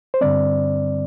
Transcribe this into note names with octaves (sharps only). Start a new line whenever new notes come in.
C5
G2 D3 G3 C4 D5